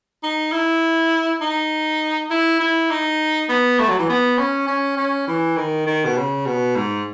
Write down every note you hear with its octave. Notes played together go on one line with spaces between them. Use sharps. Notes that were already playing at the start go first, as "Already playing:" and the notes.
D#4
E4
D#4
E4
E4
D#4
B3
A3
F#3
E3
B3
C#4
C#4
C#4
E3
D#3
D#3
B2
C#3
B2
G#2